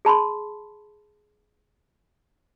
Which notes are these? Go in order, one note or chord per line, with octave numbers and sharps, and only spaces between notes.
G#4 A5 B5 C6